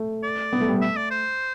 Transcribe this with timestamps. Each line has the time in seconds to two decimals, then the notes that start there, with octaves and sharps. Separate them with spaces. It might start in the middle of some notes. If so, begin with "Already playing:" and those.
Already playing: A3
0.23 D5
0.53 B3
0.61 A3
0.68 G3
0.76 A3
0.81 E5
0.96 D5
1.11 C5